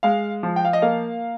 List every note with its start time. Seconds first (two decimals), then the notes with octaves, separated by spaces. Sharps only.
0.03 G#3 F5
0.43 F3
0.56 G5
0.65 F5
0.73 D#5
0.82 A#3 F5